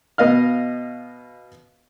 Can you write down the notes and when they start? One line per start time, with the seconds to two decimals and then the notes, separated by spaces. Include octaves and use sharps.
0.18 B2 B3 D#5 F5 F6